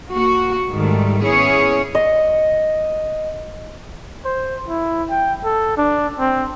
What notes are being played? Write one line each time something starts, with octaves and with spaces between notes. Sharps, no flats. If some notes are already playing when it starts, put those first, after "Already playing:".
A#3 F#4
G#2 D#3 G3 A3
B3 C#4 E4 G#4 C#5
D#5
C5
E4
G5
A4
D4
C4